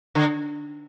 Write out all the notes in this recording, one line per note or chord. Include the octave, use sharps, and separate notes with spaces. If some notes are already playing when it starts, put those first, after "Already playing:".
D3